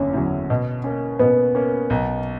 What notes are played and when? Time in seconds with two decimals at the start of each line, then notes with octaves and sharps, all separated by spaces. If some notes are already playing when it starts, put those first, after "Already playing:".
Already playing: F#1 E2 D3 C#4
0.14 E2 D3 F#3
0.50 B2
0.84 A#3 C#4
1.19 B2 B3
1.55 A#3 C#4
1.90 B1